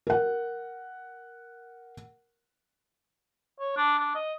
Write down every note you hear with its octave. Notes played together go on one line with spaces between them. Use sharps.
A#4 F#5
C#5
D4
D4
D#5